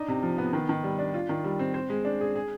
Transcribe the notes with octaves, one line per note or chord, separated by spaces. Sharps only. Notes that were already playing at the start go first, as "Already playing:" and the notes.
Already playing: D4 D#4
C3
F3
B3
D#3
D#3
G3
D4
F4
D#3
G3
C4
C5
G#3
D4
G#4
G#4